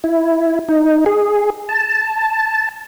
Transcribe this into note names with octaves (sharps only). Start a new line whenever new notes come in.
E4
D#4
G#4
A5